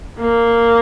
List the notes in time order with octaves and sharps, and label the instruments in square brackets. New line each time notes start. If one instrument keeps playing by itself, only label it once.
[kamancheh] A#3